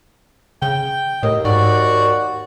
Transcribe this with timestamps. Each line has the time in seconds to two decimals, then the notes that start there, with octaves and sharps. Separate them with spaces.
0.62 C#3 G5
1.23 D#2 A2 D#5
1.45 G#2 F#4 D5